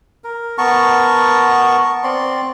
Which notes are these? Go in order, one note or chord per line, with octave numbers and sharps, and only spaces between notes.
A#4
B3 A#4 A5 C#6
C4 D5 C6